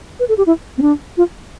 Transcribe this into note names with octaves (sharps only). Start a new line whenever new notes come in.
B4
A4
G4
E4
C4
D4
F4